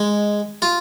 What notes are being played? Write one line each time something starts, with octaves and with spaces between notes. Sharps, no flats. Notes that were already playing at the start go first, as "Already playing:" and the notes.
Already playing: G#3
F4